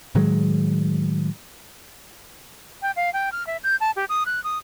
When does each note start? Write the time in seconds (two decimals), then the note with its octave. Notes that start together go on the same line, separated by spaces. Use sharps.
0.15 A2 D#3 F#3 G#3
2.82 G5
2.96 F5
3.13 G5
3.32 F6
3.47 E5
3.64 G6
3.81 A5
3.96 G4
4.09 D#6
4.26 F#6
4.44 D#6